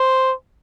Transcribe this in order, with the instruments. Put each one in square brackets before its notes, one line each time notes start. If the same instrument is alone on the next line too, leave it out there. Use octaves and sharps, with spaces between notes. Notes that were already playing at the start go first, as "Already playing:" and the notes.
Already playing: [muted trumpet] C5